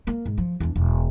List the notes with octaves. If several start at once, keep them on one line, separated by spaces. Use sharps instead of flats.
A#3
G#2
F3
E2 D4
E1